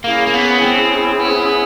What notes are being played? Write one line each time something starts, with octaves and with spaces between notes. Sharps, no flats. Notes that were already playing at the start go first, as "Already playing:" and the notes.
A#3 C#4 E4 G#4
A#3
B3
C4
B3